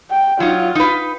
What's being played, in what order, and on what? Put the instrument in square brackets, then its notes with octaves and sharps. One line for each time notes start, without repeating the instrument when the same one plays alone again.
[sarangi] G5
[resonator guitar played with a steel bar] F#3 D#4 [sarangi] F4
[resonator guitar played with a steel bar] D#4 B4